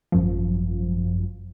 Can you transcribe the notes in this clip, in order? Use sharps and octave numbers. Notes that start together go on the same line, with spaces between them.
G#1 F#2 F3